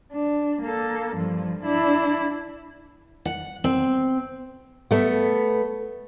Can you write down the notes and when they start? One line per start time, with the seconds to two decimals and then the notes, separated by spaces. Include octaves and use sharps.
0.12 D4
0.62 A#3 A4
1.16 G2 F3
1.64 D4 E4
3.26 F#5
3.64 C4
4.91 A3 B3